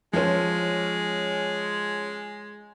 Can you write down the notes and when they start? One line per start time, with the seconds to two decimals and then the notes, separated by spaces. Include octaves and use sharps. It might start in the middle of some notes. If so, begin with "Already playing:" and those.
0.13 F3 G#3 C#4